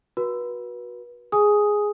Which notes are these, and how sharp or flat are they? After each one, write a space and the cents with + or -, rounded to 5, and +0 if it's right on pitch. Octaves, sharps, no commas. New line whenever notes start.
F#4 -15 B4 -30
G#4 +0 G#5 +0 D#6 +5